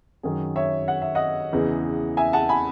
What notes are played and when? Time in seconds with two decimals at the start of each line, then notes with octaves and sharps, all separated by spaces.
0.23 F#2 D#3 F#3 G#4
0.56 C#5 E5
0.88 F#5
1.02 E5
1.15 D#5 F#5
1.53 E2 C#3 E3
2.17 E5 G#5
2.33 F#5 A5
2.49 G#5 B5